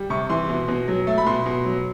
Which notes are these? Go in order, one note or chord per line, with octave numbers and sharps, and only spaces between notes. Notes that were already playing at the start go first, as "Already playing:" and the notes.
Already playing: G3
C3 C#6
E3 C6
B2
B2
F#3
A3
B5
B2 C6
B2
F#3